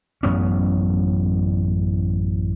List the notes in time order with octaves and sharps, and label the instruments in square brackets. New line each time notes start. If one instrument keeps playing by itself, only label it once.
[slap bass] A1 F#2 B3 C#4